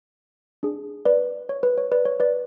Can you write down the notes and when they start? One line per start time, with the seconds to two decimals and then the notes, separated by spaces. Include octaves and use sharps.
0.63 D4 G#4
1.05 B4 D5
1.49 C#5
1.63 B4
1.78 C#5
1.92 B4 D5
2.05 C#5
2.20 B4 D5